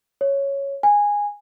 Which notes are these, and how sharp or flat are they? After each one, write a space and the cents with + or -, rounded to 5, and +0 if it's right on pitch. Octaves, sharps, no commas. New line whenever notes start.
C#5 +0
G#5 -10